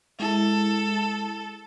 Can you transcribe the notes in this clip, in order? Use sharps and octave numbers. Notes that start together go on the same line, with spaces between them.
G#3 E4 A4